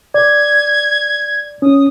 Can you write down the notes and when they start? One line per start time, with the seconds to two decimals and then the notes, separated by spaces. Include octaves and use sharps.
0.14 D5 G#6
1.62 C#4 D#6